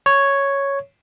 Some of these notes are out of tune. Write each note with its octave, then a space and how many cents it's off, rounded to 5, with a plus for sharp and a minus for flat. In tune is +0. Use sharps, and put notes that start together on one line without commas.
C#5 +0